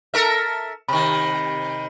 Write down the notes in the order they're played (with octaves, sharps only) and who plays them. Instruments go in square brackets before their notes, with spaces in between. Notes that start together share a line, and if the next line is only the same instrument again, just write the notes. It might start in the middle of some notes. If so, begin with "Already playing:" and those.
[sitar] A4 A#4 E5
[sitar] C3 D#3 [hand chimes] B5